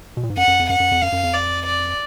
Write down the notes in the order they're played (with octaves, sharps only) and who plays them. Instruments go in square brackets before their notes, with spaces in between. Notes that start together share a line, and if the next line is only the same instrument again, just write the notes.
[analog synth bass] B2
A#2
G#2
[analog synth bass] F#2 [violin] F#5
[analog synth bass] F#2
F2
[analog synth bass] F#2 [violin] F#5
[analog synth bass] F#2
F2
[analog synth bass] F#2 [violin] F5
[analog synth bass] F#2
F2
[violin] D5
D5